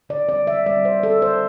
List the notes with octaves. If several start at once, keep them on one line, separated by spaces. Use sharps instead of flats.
D3 D5
G3 C4 D5
D3 E5
G3 C4 D5
D3 C5
G3 C4 A4
D3 C5